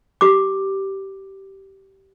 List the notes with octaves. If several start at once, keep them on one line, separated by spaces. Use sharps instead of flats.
G4 D6